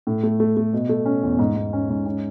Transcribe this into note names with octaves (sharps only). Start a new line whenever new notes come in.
A2
A3
A3
A3
B2
A3
C#4
E2
G#2
G#2
C#4
G#2
C#4